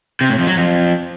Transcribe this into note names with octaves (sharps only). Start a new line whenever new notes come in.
C3
A2
F2
F#3
F2